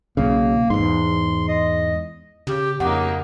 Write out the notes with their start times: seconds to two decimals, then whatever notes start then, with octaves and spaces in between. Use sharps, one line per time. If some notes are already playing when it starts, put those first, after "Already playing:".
0.17 B1 C#3 A#3
0.70 E2 G#2 C6
1.49 D#5
2.47 C#3 G4
2.80 F2 C#3 A#3 D#4 G4 F#5 D6